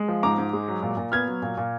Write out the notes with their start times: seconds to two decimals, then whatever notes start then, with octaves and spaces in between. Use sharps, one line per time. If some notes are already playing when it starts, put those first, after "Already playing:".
Already playing: G#3
0.08 F3
0.23 G#2 A#5 D6
0.38 G#2
0.53 G#3
0.67 F#3
0.83 A#2
0.97 A#2
1.12 B3 F6 G#6
1.27 F#3
1.42 A#2
1.57 A#2